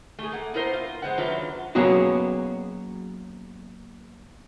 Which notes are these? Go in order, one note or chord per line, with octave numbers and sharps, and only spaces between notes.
A3 G#4
A#3 F#5
B3 E4 A#4 C5
F4
G#3 B3 C5 F#5
F#2 D#3 F#3 D4 F4 B4
F#3 A#3 B3 C#4 F#4 G#4